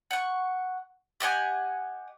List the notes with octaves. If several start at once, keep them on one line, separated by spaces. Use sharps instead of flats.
F#5 C#6
G4 D#5 F#5 G#5